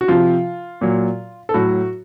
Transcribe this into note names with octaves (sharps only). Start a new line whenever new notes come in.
F#4
C3 F3 F4
A#2 F#3
A4
A2 F#3 F#4